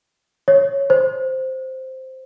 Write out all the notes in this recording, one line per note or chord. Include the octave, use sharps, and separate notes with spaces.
C#5
C5